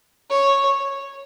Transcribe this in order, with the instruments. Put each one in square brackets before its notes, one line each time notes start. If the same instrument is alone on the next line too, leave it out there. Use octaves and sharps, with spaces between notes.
[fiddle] C#5